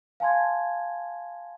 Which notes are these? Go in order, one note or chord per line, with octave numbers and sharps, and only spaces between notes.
F5 G#5 A5 C6 G#6